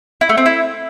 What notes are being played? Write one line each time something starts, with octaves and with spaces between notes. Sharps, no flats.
E4
A3
C4
E4